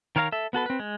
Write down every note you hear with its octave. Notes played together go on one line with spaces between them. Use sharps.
D#3 A#4 C#5 F5 A#5
A4 E5
B3 F#4 A4 B4
C4 B4
G#3